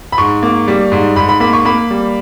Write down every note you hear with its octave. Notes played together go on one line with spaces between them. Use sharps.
B5
G#2 C#6
A#3
G3
G#2
G#2 B5
B5
A#3 B5
C#6
A#3 B5
G3